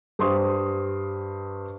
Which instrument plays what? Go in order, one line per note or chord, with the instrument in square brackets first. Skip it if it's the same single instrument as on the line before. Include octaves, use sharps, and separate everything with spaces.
[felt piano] G2 G4 C5 C6 C#6 D#6